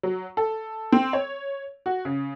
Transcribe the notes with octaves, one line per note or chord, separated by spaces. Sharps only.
F#3
A4
C4
C#5
F#4
C#3